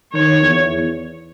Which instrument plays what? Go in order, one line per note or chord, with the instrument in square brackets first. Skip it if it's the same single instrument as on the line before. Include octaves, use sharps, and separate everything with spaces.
[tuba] D#3 [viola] C#5
[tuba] E2